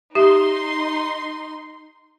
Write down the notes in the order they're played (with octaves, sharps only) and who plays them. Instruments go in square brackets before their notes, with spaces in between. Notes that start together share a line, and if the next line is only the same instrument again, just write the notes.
[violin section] D#4 C6 [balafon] G4 E5